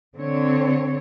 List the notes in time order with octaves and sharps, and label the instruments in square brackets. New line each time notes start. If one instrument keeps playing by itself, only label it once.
[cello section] D3 C4 C#5